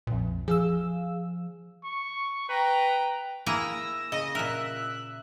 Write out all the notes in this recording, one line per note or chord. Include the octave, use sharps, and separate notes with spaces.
A#1 F2 A#2
F3 G#4 F5 E6
C#6
B4 G5 A#5
A#3 E4 G#4 E6 A#6
C#3 D#5
A#2 A#4 E5 F#6